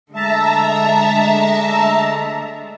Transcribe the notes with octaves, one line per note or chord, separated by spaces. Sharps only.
D3 G#3 A3 E5 A5 A#5